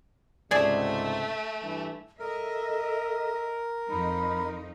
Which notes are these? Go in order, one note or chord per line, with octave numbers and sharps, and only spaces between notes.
C#2 G#2 C3 A3 G#4 D5
G2 E3
A4 A#4 D#5 E5
F2 F3 D#4 B5